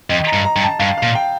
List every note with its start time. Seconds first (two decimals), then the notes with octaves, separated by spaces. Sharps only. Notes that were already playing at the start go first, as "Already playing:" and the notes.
0.09 F2 D#5
0.27 A#5
0.33 G2
0.45 A#5
0.56 G2
0.62 A5
0.79 G2 F5
0.98 F5
1.03 A#2
1.15 G5